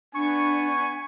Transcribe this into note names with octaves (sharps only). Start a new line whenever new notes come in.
B3 D4 G#5 C#6